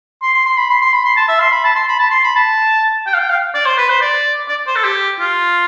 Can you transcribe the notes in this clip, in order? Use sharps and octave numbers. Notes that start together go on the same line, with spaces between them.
C6
C6
C6
B5
C6
C6
B5
C6
A5
E5
C6
B5
A5
C6
B5
A5
C6
B5
A5
G5
F5
G5
F5
D5
C5
B4
C5
D5
D5
C5
A4
G4
F4